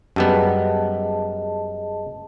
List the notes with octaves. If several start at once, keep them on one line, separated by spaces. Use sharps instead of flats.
F#2 G3 B3 G#4 D#5 A5